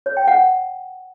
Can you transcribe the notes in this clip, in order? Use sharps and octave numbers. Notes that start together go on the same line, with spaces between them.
C#5
G5
F#5